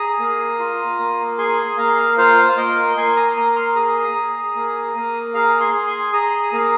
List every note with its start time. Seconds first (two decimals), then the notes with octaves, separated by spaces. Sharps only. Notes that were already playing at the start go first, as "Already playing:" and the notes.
Already playing: G#4 A#5 D#6
0.19 A#3
0.59 F4
0.99 A#3
1.38 G#4 G#5 C6
1.78 A#3 F5 A#5
2.18 F4 C5 F5
2.49 F5
2.57 A#3 A#4 D#5
2.97 A#3 G#5 C6
3.16 A#5 D#6
3.36 A#3 A#5 D#6
3.56 C6 F6
3.76 G#4 A#5 D#6
4.16 G#4
4.55 A#3
4.95 A#3
5.34 G#4 F5 A#5
5.60 G#5 C6
5.73 G#4
5.87 G#5 C6
6.13 G#4 A#5 D#6
6.53 A#3 A#5 D#6